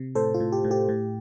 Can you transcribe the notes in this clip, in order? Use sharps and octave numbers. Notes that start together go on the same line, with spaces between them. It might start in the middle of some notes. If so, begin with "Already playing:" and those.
Already playing: C3
A2 A4 C5
F4
A2
G4
A2
G4
A2